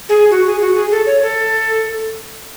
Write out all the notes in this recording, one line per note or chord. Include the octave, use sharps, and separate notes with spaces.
G#4
F#4
G#4
F#4
G#4
A4
C#5
A4